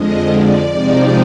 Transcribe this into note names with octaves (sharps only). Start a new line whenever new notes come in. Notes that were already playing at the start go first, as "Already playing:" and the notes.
Already playing: F2 D3 F3 G#3 D#5
D5
C3 F3 G#3 C4 D#4